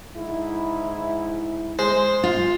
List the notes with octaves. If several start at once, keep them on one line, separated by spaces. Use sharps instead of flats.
G#2 E4
G#3 C5
F4